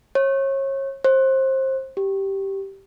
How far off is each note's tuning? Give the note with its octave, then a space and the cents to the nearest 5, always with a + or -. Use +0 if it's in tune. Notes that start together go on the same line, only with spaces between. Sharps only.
C#5 -30
C5 +25
G4 -10